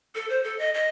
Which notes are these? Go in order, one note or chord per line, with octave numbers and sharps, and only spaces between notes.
A4
C5
A4
D#5
D#5